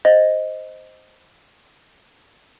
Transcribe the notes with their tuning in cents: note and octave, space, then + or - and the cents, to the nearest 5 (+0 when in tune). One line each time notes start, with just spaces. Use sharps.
C5 +0 D#5 +0